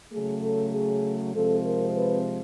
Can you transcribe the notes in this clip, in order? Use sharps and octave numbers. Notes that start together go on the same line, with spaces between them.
C#3 F#3 A3 G#4
A4
G#4
C3 F3 G#3 C4 A4
A#4
B4